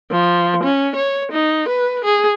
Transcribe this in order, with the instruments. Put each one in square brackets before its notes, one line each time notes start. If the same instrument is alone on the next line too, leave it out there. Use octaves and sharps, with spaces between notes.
[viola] F3
C#4
C#5
D#4
B4
G#4